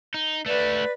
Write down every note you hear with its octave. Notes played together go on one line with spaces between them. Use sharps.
D#4
A3 F#4 B4 D5